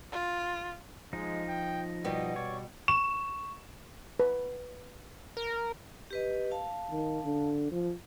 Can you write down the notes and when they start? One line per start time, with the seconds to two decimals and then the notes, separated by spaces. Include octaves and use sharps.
0.12 F4
1.13 F3 G#3 D#4
1.48 G5
2.04 B2 G3 B3 D#5
2.36 C#5 D5
2.88 C#6 E7
4.20 B4
5.37 A#4
6.11 G4 B4 D#5
6.51 F5 A5
6.91 D#3
7.24 D3
7.72 F3